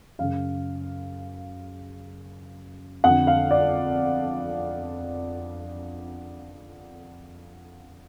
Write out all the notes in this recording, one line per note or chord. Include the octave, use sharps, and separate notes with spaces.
F#2 C#3 F5
F2 D3 F#5
F5
D5